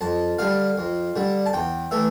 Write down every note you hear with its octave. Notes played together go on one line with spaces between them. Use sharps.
F2 A5
D3 G3 F5
F2
D3 G3
A5
E2 G5
E3 A3 E5